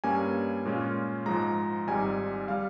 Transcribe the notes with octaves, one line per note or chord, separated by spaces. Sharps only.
G2 G3 A#3 C#4 G#5
A#2 G#3 C#4 F4
G#2 F3 G#3 A#5
G#1 G#2 G3 G#5
G3 F5